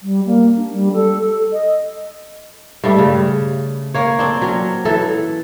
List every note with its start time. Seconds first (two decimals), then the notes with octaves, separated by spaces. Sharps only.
0.02 G3
0.26 A#3
0.57 D4
0.73 G3
0.93 A4
1.53 D#5
2.84 G2 G3 A3
2.98 C#3
3.94 A#3 C#5
4.19 C4 D4
4.41 F#3 C#4
4.85 E3 A4